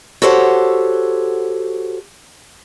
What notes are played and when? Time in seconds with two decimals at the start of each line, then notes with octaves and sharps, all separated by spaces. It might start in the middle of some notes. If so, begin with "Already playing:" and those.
0.22 F#4 G4 A4 C5 C#5 F#5